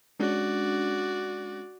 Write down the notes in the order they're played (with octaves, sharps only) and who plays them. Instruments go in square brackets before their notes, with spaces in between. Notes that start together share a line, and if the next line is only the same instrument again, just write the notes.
[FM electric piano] G#3 C#4 D4 [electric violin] F#4 D5